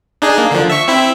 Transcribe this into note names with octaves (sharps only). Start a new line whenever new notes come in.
D4 D#4 G#4
A#3
D3 F3
E5 C#6
C4 E4 E5